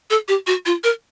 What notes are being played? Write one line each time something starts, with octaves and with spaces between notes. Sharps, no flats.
A4
G4
F#4
F4
A#4